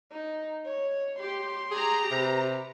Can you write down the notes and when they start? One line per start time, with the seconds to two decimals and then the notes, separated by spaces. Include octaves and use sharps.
0.11 D#4
0.66 C#5
1.19 G4 C6
1.71 G4 G#4 A#5
2.11 C3 B4